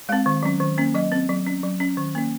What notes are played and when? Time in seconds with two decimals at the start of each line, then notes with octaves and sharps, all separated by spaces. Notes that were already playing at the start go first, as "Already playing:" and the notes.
0.09 G#3 C4 F5
0.26 D#3
0.43 F#3 C#4
0.60 D#3
0.78 A#3 C#4
0.95 F#3 D#5
1.12 C4
1.29 F#3
1.47 C#4
1.63 F#3
1.80 C#4
1.97 D#3
2.15 A#3 C#4